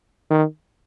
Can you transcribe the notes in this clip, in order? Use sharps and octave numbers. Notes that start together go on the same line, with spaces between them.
D#3